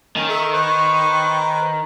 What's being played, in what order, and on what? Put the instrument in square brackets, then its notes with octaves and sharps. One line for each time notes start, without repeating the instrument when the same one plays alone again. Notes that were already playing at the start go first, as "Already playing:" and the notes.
[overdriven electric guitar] D#3 [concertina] C#4
[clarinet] A4 [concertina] E5 C#6
[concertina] B4 C5 [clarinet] C#6